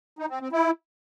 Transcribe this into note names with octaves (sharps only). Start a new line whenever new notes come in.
D#4
C4
C4
E4